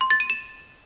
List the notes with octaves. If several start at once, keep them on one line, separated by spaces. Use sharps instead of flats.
C6
A6
D#7
E7